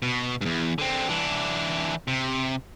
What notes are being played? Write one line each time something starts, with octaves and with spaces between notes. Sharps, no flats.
B2
E2 G2
D3 C4
E3 D4
C3